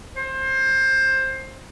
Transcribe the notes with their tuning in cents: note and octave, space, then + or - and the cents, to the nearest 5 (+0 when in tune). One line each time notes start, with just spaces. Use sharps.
C5 +20